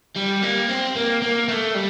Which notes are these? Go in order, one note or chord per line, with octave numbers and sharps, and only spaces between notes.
G3
A#3
C4
A#3
A#3
A3
G3